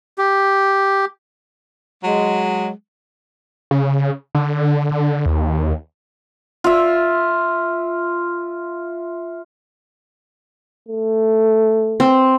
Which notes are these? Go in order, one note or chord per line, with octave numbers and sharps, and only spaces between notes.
G4
F#3 G#3
C#3
D3
D3
D#2
F4 E5
A3
C4